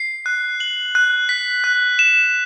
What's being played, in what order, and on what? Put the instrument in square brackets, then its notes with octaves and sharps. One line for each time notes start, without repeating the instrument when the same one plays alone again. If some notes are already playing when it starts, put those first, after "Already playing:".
Already playing: [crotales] C7
F#6
F#7
F#6
B6
F#6
E7